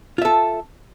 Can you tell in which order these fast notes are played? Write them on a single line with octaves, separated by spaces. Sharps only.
F4 E5 A4